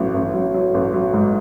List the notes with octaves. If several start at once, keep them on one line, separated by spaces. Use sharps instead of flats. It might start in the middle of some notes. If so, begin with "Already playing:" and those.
Already playing: A1 F#3
A1
F#3
F#3
A1
F#3
G#2